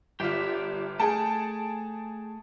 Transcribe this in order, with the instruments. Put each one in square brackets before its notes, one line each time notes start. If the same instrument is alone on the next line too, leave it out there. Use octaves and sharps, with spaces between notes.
[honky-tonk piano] G1 F4 [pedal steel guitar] G4 D5 E5
[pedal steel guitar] A3 G5 [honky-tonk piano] G#4 A5